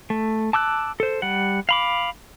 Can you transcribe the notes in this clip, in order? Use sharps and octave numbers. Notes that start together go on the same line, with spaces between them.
A3
A5 D6 E6 F#6
A4 C5
G3 F#5
F5 B5 D6